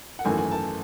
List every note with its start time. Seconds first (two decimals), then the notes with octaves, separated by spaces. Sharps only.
0.19 F#5
0.25 G#1 F#2 E3 A3 G#5
0.38 G#5
0.51 A5